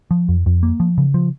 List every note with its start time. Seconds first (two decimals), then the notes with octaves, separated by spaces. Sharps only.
0.11 F3
0.29 F2
0.46 F2
0.63 A#3
0.80 F3
0.98 C#3
1.14 F3